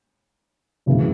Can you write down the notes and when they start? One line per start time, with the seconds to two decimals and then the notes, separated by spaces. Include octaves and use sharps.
0.86 F#2 C#3 E3 A3